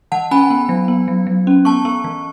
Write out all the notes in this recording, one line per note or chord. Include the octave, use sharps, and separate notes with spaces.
E3 F#5 A5
C#4 G#5 B5
B3
F#3
B3
F#3
F#3
C#4
B3 A5 C#6
B3
E3